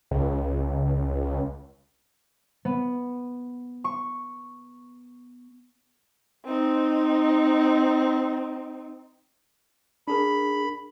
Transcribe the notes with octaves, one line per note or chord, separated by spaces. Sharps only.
C#2
B3
C#6
C4 D#4
D4 G#4 A#4 B5